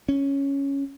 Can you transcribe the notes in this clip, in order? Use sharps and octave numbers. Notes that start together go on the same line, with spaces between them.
C#4